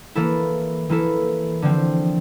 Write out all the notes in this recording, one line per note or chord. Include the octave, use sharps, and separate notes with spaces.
E3 A#3 E4 A4
E3 A#3 E4 A4
D3 F3 C4